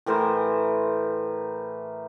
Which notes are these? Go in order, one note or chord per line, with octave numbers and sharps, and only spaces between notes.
A2 E3 A#4 C5